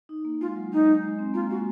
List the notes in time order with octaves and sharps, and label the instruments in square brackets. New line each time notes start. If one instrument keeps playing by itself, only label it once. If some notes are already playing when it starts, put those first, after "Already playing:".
[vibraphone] D#4
A#3
[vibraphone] G#3 [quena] F4
[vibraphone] F#3
[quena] D#4
[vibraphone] G#3
C4
[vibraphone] A#3 [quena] F4
[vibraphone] G#3 [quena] F#4